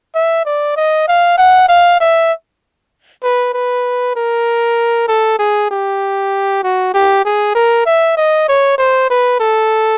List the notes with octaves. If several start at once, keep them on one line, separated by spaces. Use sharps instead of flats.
E5
D5
D#5
F5
F#5
F5
E5
B4
B4
A#4
A4
G#4
G4
F#4
G4
G#4
A#4
E5
D#5
C#5
C5
B4
A4